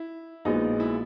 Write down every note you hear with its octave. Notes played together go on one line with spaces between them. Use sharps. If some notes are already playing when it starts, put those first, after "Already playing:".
Already playing: E4
A#1 A#2 G#3 B3 D#4 F#4
E4